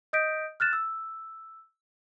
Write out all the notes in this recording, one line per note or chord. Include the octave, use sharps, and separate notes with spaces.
D#5 D#6 G6 A#6 B6 D7
F6 F#6 A6 E7
E6